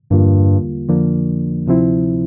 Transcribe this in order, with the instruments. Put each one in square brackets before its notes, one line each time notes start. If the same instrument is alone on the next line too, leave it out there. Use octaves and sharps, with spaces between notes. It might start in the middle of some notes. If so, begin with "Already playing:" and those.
[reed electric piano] E2 D3 G3 A#3 F4 [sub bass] G2
[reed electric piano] F2 D3 F3 A#3 D4
D2 C3 F3 C4 E4